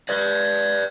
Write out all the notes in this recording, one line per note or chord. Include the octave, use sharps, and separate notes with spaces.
B4 D5